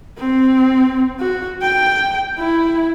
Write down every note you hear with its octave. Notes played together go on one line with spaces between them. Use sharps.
C4
F#4
G5
E4